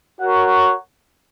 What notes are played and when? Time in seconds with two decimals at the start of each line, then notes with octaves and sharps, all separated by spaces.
0.21 F#4 A#4 C#5 F#5